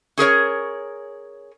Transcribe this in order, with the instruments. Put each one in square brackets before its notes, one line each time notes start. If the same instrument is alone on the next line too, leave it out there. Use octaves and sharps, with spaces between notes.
[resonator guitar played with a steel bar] C#4 G#4 A#4 C#5